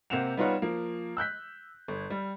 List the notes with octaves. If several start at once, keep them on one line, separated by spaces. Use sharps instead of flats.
C3 A#3 C4 F#5 E7 F7
G3 B3 D#4 F4 C#5 F#5
F3 A#3
E6 F#6 G6 B6
G1
G3